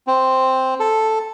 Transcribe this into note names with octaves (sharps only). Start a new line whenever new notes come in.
C4
A4